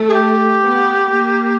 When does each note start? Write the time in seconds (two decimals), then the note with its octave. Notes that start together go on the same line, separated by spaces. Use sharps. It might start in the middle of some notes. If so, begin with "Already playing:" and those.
Already playing: A3
0.08 G#4
0.13 G4
0.61 B3
1.09 A#3